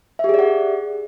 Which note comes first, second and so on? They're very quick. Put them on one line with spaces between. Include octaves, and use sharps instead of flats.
E5 G4 G#4 D5 F#5